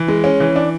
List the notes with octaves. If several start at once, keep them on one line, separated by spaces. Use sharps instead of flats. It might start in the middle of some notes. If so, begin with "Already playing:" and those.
Already playing: E3
G#3
C#4
E3
D4